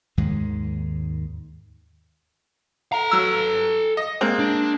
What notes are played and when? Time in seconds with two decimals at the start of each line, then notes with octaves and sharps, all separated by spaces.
0.17 D#2 G#2 D#3 G#3
2.92 A4 A#5
3.11 F#3 E6
3.97 D#5
4.21 G#3 A#3 C4
4.39 D4